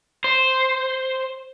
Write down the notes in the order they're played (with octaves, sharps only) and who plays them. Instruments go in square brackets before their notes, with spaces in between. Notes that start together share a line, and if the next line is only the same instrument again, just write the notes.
[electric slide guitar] C5